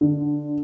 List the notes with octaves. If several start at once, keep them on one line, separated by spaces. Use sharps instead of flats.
D3